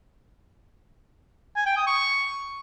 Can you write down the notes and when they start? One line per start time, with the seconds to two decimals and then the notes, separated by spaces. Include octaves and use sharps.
1.56 G#5
1.66 G5
1.77 D#6
1.87 C#6